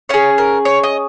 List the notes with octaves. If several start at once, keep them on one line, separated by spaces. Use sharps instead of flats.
C#4 G#4 C#5
A#4
C#5
D#5